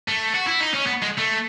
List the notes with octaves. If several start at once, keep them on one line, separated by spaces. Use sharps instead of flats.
A3
F#4
E4
D#4
C#4
B3
G#3
A3